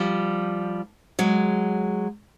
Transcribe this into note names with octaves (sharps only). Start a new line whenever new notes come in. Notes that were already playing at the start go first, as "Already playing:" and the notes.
Already playing: F3 G3
F#3 G#3